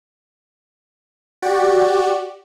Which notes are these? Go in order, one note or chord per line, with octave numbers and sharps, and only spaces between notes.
F#4 G4 D5